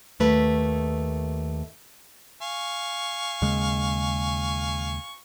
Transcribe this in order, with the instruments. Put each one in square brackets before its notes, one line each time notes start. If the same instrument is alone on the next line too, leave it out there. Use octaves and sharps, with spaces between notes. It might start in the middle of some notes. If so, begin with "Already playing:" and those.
[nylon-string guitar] D#2 A3 B4
[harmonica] F5 G#5 C#6
[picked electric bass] D#2 C#3 G#3